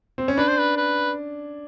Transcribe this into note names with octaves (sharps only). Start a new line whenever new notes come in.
C4
C#4
D4 B4
C5
B4
B4